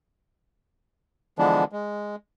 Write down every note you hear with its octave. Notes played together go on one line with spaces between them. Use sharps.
D3 E3 F3 G#3 B3 D4
G#3